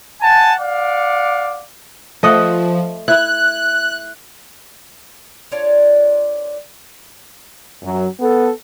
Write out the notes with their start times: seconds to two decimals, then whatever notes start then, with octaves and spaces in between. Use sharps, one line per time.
0.21 F#5 G#5 A5
0.59 D5 F5 F#5 D6
2.23 F3 A3 D#5 F#5
3.08 E4 F#6
5.51 D4 F4 C#5 D5
7.82 F#2 F#3
8.20 B3 A4